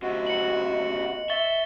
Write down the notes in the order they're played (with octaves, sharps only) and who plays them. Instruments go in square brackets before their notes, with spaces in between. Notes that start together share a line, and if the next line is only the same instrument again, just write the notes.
[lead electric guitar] D2 C3 [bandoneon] F#4 [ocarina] D#5
[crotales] C#7 F#7
[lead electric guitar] E5 [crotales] C#6 A6 G7